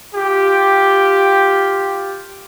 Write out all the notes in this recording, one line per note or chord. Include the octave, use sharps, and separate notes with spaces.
F4 G4